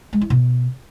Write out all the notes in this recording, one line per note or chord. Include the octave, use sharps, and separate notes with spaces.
G#3
E4
B2